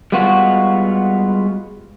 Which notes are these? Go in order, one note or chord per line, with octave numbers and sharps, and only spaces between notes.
G3 G#3 B3 F4 F#4